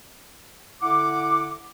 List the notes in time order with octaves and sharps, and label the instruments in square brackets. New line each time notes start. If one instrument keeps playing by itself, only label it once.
[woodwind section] D3 E4 F#5 D6